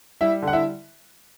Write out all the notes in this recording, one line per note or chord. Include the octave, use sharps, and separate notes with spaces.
G3 E4 E5
D3
F#5
E4 E5